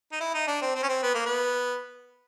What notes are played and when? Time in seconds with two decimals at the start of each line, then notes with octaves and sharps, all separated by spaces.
0.12 D#4
0.20 E4
0.34 D#4
0.47 D4
0.62 C4
0.75 C4
0.83 C#4
0.89 C4
1.03 B3
1.14 A#3
1.26 B3